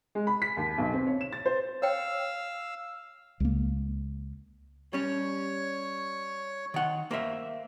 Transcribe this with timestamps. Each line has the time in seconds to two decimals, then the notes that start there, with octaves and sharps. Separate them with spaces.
0.15 G#3
0.27 B5
0.42 B6
0.57 D#2
0.78 B1
0.94 C4
1.07 C#5
1.21 E7
1.33 A6
1.46 C5
1.82 C#5 F5 G5 E6
3.40 C#2 A#3
4.93 G3 C#4 C#5
6.74 D#3 F#5
7.11 A#3 C5 E5